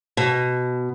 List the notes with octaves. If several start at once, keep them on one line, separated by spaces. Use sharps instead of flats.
B2